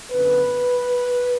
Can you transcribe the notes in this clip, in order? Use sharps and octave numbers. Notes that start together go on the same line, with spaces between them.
F#2 D3 B3 B4